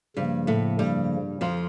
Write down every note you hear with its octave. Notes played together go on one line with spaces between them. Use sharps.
G2 C#3 F3 G3 A#3
A2 A3
G2 G3
F2 F3